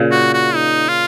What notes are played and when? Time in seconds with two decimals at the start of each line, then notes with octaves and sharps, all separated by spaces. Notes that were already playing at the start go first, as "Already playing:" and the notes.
Already playing: A#2 C#3
0.11 F#4
0.33 F#4
0.55 D#4
0.89 F4